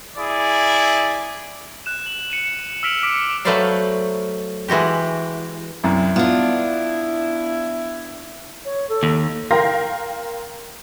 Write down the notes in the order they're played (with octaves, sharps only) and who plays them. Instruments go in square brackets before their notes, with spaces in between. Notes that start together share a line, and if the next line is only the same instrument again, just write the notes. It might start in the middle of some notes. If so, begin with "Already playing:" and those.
[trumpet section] E4 G#4 D5
[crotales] F#6 E7
F#7
C#7 D#7 E7
E6 F6 B6 D7 F7
D6 E6 F6 B6 C#7 D7
[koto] F#3 A3 B4 C5 D5 F5
E3 G#3 F#4 G4
[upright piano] C2 F#2 [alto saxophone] E4
[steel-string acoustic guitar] B3 D4 [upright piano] F4
[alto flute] C#5
A4
[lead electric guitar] D#2
[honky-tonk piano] A#4 F5 G5 C6 A#6